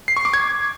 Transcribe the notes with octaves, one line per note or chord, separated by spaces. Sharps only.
C7
C#6
D6
G#6